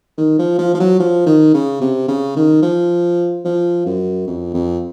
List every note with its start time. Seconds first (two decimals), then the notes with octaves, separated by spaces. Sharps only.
0.18 D#3
0.39 F3
0.59 F3
0.75 F3
0.80 F#3
1.00 F3
1.26 D#3
1.54 C#3
1.81 C3
2.08 C#3
2.36 D#3
2.62 F3
3.45 F3
3.86 F#2
4.27 F2
4.54 F2